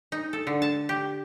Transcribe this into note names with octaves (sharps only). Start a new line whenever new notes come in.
D#4
A4
D3
A5
G4